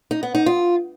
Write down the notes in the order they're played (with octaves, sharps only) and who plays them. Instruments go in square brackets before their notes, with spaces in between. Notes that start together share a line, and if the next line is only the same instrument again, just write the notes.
[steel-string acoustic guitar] D#4
B3
D#4
F4